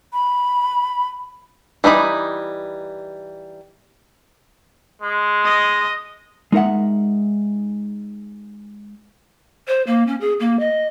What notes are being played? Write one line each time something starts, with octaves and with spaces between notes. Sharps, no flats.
B5
E3 G3 D#4 B5
G#3
D#5
G#3 D#4 A#4 E5 F#5
C5
A#3
C#4
G#4
A#3
D#5